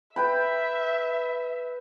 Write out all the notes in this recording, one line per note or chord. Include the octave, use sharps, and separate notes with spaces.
B4 E5 G5 B5